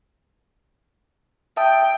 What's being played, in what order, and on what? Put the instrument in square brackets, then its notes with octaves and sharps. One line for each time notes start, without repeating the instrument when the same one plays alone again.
[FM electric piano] E5 A5 D#6 [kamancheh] G5